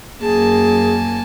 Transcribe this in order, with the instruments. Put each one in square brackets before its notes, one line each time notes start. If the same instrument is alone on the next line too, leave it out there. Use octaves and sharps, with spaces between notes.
[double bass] F#2 [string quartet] A#3 [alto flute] G#4 [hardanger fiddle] G#5 A5